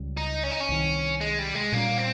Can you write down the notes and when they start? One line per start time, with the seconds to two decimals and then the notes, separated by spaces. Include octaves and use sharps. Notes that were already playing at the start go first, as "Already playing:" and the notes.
Already playing: C#2 C#3 G3
0.17 D#4
0.44 C#4
0.51 D#4
0.61 C#4
0.69 C2 C3 D#3
1.21 G#3
1.38 G3
1.54 G#3
1.72 A#2 G3 A#3 C#4
1.97 C4